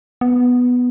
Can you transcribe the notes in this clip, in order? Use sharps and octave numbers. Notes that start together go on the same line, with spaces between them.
B3